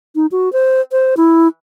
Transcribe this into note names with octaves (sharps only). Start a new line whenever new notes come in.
D#4
F#4
C5
C5
E4